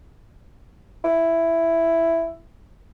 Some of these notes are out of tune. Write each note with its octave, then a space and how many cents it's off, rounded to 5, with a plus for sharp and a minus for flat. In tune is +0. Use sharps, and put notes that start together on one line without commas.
E4 +5